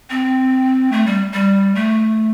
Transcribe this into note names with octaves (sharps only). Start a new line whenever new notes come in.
C4
A3
G3
G3
A3